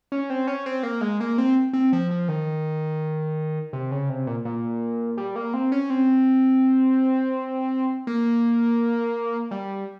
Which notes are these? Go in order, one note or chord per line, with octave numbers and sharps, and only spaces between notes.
C#4
C4
C#4
C4
A#3
G#3
A#3
C4
C4
F3
F3
D#3
C3
C#3
C3
A#2
A#2
G3
A#3
C4
C#4
C4
A#3
G3